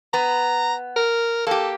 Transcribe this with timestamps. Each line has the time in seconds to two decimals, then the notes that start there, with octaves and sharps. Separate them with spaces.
0.14 B3 A#5
0.96 A#4
1.47 A#3 G4 A4